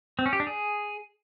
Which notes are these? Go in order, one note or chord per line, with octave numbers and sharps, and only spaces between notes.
C4
C#4
G4
D4
G#4